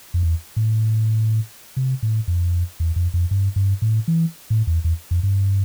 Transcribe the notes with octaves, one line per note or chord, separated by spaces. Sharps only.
F2
E2
A2
C3
A2
F2
E2
F2
F2
G2
G2
A2
E3
A2
E2
E2
F2
G2